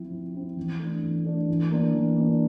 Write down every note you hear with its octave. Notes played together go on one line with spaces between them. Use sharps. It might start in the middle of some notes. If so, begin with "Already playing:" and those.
Already playing: F3 C4 E4
F3
C4 E4
E3
A3
D4
E3
A3 D4
E3
A#3 D4
E3
A#3 D4